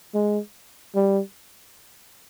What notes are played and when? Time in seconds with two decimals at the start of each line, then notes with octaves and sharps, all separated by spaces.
0.14 G#3
0.95 G3